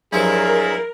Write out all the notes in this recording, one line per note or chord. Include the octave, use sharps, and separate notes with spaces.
G2 F3 F#3 E4 F4 G#4 A#4